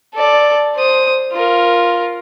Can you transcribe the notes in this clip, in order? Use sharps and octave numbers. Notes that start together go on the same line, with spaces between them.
A4 D5
C5 D#6
F4 A#4